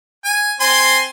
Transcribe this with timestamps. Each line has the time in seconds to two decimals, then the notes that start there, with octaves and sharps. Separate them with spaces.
0.25 G#5
0.60 C4 G#5 C6